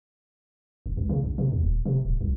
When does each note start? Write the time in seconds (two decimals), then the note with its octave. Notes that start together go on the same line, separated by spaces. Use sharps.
0.86 F#1
0.97 C#2
1.09 C#3
1.24 A#1
1.38 C3
1.52 D#2
1.63 D#1
1.85 C3
2.05 D1
2.21 C2